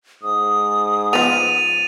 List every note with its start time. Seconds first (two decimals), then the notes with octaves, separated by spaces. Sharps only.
0.23 G#2 D#6
1.13 F3 B3 A6 D#7 F7